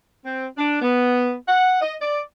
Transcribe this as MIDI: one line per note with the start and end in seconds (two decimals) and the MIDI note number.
0.25 0.47 60
0.58 0.80 62
0.82 1.35 59
1.48 1.79 78
1.81 1.95 75
2.01 2.22 74